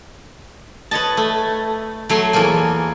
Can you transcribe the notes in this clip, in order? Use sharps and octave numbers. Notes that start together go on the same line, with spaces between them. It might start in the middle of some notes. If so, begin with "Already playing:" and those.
B4 C#5 D#5 A5
A3
F#3 A3 C#5 C6
E2 F3 A3 A#3 G#5